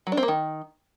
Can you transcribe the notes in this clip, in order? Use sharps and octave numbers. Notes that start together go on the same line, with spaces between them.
F#3
D4
C4
A#3
D#3